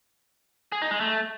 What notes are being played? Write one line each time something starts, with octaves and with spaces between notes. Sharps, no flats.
G#4
D#4
G#3
A3